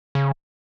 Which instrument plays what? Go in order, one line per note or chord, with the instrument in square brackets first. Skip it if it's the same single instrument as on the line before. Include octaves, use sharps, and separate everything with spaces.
[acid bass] C#3